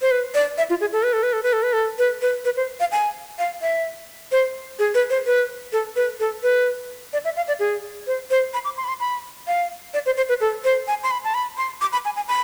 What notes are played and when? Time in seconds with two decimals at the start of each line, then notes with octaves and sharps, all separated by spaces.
0.02 C5
0.11 B4
0.34 D5
0.58 E5
0.70 F4
0.81 G#4
0.92 A4
1.03 B4
1.13 A4
1.23 B4
1.33 A4
1.43 B4
1.53 A4
1.63 B4
1.73 A4
1.98 B4
2.22 B4
2.45 B4
2.56 C5
2.80 F5
2.92 G#5
3.39 F5
3.62 E5
4.32 C5
4.79 G#4
4.94 B4
5.10 C5
5.26 B4
5.73 A4
5.96 B4
6.20 A4
6.43 B4
7.13 D5
7.25 E5
7.37 F5
7.48 D5
7.60 G#4
8.07 C5
8.30 C5
8.54 B5
8.65 D6
8.77 C6
8.84 B5
8.88 C6
9.00 B5
9.47 F5
9.94 D5
10.06 C5
10.17 C5
10.29 B4
10.41 A4
10.64 C5
10.88 G#5
11.03 C6
11.11 B5
11.24 A5
11.34 B5
11.58 C6
11.81 D6
11.92 B5
12.05 G#5
12.16 G#5
12.28 B5